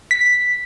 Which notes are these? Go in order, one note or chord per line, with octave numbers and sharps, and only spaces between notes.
B6